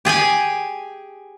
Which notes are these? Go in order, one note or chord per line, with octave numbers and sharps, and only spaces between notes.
G4 G#4 G5 G#5